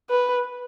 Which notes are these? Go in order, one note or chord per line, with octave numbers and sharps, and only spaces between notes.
B4